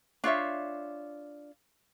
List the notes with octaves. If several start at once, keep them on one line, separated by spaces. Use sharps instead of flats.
D4 F4 C#5 E5